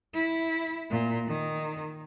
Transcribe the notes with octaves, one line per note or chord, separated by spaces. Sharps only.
E4
A#2
D#3